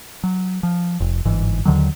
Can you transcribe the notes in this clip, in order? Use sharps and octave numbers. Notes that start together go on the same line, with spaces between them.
F#3
F3
F1
G1 G#2 E3
D#2 D3 D#3 F#3